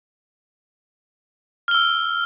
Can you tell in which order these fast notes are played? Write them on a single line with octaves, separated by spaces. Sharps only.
F6 G7 E6